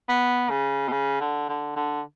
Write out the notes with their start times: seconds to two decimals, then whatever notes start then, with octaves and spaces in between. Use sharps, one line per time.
0.09 B3
0.50 C#3
0.88 B2
0.92 C#3
1.20 D3
1.49 D3
1.76 D3